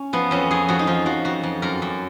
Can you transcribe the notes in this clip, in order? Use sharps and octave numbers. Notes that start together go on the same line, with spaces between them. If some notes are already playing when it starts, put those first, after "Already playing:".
Already playing: C#4
F3 B3
F2 C#4
F2 G#4
F3 F#4
D#4
F3 F4
F3 F#4
F2 F#4
F2
F#2 A#4
F#2